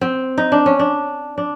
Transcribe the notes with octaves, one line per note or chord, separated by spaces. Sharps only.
C4
D#4
D4
C#4
D4
D4